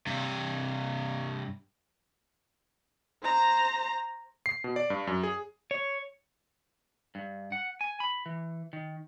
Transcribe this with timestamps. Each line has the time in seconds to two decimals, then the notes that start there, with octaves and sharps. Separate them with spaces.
0.07 G2 C3
3.23 C5 A#5
4.46 C7
4.64 B2
4.76 D5
4.90 G2
5.07 F#2
5.23 G#4
5.71 C#5
7.15 G2
7.52 F#5
7.81 G#5
8.00 B5
8.26 E3
8.73 D#3